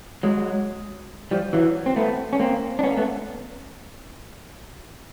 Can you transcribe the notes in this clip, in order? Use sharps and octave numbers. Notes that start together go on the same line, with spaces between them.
F#3 G#3
F3 G3
E3 F#3
C4
A3 B3
C#4
A#3 C4
D4
B3 C#4
A#3
A3 B3